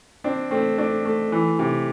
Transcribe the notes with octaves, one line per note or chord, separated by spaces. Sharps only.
C4 D4
A3 C4
A3 D4
A3
E3
C3